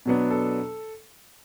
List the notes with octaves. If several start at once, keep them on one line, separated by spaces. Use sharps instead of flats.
B2 F#3 B3 D4
A4